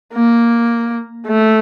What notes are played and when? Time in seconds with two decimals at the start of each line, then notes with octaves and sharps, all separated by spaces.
0.14 A#3
1.27 A3